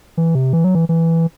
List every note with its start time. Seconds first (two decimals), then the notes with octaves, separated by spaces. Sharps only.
0.17 E3
0.35 C3
0.53 E3
0.64 F#3
0.75 E3
0.89 E3